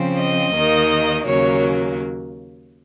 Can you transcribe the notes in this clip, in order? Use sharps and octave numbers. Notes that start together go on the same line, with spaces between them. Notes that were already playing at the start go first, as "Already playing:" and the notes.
Already playing: C#3 F3 C4
D#5
D#2 D#3 A#3 D#4
D#2 C#3 F#3 A#3 C#5